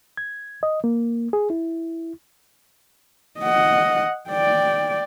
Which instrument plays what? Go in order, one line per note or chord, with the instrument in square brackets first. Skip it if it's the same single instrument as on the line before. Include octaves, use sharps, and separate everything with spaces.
[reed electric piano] G#6
D#5
A#3
G#4
E4
[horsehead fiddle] D#5 F#5
D5 G5